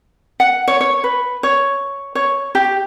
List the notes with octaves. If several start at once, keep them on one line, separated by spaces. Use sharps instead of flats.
F#5
C#5
C#5
B4
C#5
C#5
G4